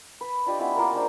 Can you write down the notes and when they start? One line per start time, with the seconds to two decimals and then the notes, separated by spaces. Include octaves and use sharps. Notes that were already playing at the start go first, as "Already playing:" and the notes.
0.21 B4
0.46 D4 F4 G4 D#5
0.59 B3 C#4 E4
0.76 A#3 F4 A#4
0.92 G#3 A#3 D4 C5